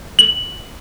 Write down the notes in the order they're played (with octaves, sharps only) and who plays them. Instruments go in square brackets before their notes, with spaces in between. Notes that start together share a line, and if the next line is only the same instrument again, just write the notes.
[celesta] F#7